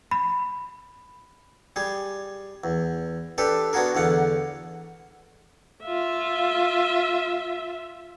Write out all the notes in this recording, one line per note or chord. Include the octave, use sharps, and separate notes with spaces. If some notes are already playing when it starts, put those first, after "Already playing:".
B5
G3 G#4
E2
D4 G4 A4 B4
B3 D4 F#4 G#4 A#4
E2 D3 F5 F#5
F4 E5